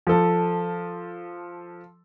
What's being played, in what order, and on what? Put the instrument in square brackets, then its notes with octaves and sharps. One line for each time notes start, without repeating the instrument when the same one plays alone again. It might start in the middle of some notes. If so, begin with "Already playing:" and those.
[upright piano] F3 A4